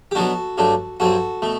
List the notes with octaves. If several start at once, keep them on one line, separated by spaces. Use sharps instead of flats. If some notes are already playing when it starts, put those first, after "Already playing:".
G4
B2 F#3 B3 D4 F#4 A4
G2 F#3 A3 D4
G2 F#3 C4 F#4 A4
B2 A3